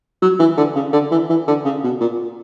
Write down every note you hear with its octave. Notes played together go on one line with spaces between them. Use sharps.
F#3
E3
D3
C#3
D3
E3
E3
D3
C#3
B2
A#2